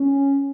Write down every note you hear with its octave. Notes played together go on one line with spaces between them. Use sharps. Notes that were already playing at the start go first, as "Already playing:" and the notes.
Already playing: C#4